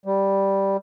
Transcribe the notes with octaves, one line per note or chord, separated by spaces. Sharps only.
G3